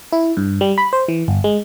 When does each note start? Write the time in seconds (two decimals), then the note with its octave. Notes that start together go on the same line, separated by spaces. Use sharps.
0.13 E4
0.37 G2
0.61 G3
0.78 B5
0.93 C5
1.08 E3
1.28 G1
1.44 G#3